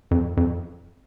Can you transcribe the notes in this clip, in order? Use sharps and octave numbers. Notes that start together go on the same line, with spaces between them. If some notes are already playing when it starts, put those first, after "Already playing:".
F2
F2